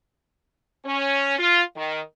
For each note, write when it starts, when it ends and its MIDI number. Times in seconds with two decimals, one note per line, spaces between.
0.85 1.35 61
1.38 1.62 65
1.76 2.00 51